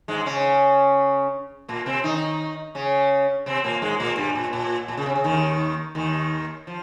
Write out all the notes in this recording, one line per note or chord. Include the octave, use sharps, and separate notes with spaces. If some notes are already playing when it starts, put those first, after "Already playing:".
G#2 G#3
C#3 C#4
A#2 A#3
C3 C4
D#3 D#4
C#3 C#4
C3 C4
A#2 A#3
G#2 G#3
A#2 A#3
G2 G3
A#2
A#2
A#2
C#3
C3
C#3
D#2 D#3
D#2 D#3
F3